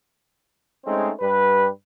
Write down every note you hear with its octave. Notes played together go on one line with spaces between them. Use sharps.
G#3 A3 C4 C#4 D#4 C5
G2 G3 G4 B4